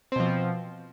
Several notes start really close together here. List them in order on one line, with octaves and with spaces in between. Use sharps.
C4 B2 F3